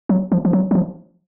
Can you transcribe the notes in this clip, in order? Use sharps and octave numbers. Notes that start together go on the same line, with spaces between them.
F#3
F3
F3
F#3
F#3
F3